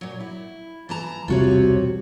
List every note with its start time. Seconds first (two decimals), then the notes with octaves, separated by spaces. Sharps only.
0.01 A#2 F#3
0.20 E4
0.89 E3 A5 A#5
1.28 E1 C2 C3 F4 F#4 C#5